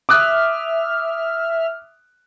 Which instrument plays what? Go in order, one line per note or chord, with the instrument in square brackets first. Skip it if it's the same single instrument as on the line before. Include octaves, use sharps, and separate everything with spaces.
[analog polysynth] E5 F6 [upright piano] D6 D#6 F#6